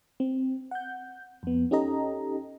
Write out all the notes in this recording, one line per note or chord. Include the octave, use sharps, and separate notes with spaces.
C4
F#5 G6
F2 B3
C#4 D#4 G4 A4 D#5 A#5